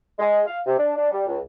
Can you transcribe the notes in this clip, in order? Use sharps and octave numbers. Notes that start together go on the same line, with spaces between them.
G#3
F5
C3
D4
D4
G3
C#2